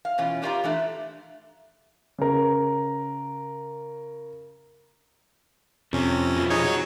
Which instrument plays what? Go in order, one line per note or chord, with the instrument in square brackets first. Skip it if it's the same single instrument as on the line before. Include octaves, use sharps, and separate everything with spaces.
[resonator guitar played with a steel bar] F5
B2 E3 C#4 F4
D4 F4 G4 D5 F5 A#5
E3 A3 D4
[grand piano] C#3 A#4
[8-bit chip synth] F2 C#4 [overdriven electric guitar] C3
[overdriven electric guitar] B2 F3
[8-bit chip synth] D#4 G#4 C#5
[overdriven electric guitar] F#3